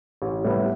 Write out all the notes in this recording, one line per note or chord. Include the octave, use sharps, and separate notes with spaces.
A1
A2 G3 B3